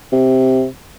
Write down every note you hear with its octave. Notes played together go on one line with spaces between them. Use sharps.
C3